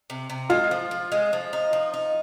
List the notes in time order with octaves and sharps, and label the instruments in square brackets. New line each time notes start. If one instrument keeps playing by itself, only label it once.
[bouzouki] C3
C3
[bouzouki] G#3 [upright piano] F4
[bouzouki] F3
F3
G#3
F3
D#4
F3
D#4